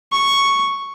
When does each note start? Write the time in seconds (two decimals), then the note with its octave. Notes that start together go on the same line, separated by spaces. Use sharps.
0.12 C#6